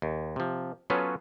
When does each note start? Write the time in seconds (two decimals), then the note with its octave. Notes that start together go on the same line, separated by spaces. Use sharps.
0.02 D#2
0.36 C3 F3
0.90 F#3 B3 C#4 F4 A4 B4